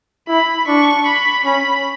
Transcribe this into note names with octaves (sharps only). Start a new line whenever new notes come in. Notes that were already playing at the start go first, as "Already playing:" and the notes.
E4 B5
D4 C#6
B5
C#4 B5